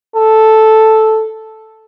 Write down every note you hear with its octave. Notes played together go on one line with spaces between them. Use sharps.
A4